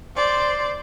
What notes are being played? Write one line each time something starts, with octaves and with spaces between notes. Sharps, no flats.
C5 D5